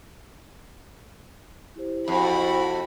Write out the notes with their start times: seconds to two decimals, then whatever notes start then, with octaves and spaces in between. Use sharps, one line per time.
1.76 E4 G4 C5
2.08 F2 F#4 B5